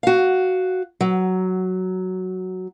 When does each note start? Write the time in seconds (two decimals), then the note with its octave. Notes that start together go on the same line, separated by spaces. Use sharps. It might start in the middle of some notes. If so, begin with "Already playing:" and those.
0.03 F#4 F5
1.01 F#3